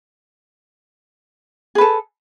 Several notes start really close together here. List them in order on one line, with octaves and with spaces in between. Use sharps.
G#4 B4 A4